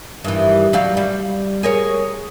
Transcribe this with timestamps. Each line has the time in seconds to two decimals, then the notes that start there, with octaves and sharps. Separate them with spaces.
0.24 G2 D#3 E3
0.73 F#3 G3 F5
0.97 G3
1.63 G#4 A#4 C#5